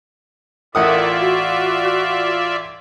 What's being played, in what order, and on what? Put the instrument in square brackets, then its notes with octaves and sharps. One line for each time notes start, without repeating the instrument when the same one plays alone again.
[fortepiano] A1 F#5 D#6 [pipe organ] F4 D5 E5 [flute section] A#4
[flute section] F#4